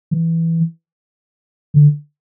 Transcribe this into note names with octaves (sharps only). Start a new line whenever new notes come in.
E3
D3